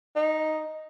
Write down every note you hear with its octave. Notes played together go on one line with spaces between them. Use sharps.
D#4